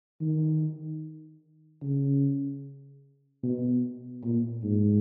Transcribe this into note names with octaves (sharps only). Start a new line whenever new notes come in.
D#3
C#3
B2
A#2
G#2